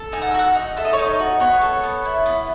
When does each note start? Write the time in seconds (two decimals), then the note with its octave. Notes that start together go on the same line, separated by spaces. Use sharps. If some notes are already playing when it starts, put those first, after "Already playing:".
Already playing: A4
0.12 D#4 G#5
0.22 F#5
0.31 E5
0.34 F#4 F#5
0.55 D#4
0.77 A4 E5
0.85 D#5
0.93 C#5
0.99 D#4 D#5
1.19 F#4
1.40 B3 C#5
1.61 A4
1.83 B3
2.05 E4
2.26 B3